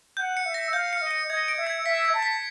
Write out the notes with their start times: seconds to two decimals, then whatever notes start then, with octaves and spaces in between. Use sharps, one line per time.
0.17 F#5 G6
0.37 C#7
0.45 E5
0.54 A#6
0.73 F5 G6
0.93 C#7
1.01 D#5
1.11 C#7
1.30 D#5 G#6
1.48 D7
1.58 E5
1.67 G#6
1.86 E5 B6
2.05 G#6
2.13 A5
2.23 B6